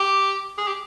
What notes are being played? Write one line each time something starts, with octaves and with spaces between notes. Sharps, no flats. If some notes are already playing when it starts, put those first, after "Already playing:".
Already playing: G4
G#4
G4